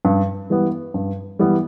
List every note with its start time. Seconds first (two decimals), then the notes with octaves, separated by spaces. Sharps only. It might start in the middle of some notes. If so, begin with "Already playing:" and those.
0.05 G2
0.50 E3 G3 B3
0.94 G2
1.39 E3 G3 B3